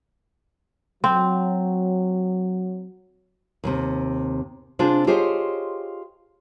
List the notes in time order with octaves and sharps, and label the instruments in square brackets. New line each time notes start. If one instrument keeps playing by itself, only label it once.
[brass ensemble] F#3 [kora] C4
[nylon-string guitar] D#2 A2 C3
C3 D4 F4 G#4 C5
F4 G4 G#4 C5 C#5 D#5